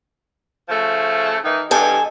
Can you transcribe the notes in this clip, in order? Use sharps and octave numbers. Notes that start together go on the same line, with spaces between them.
C#3 F3 A3
D#3 E3 D#4
E2 G2 A4 D#5 G#5